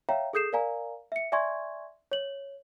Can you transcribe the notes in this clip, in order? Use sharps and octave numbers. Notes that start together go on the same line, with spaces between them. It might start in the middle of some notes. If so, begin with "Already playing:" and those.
C#5 E5 F5 G5 A#5
G#4 A4 D#6 G6 C7 E7
A#4 D5 F5 G#5 A#5
E5 C#7
D5 E5 G#5 C6 C#6 G#6
C#5 F#7